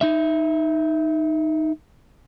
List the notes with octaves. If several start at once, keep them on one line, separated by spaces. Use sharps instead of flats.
D#4 E5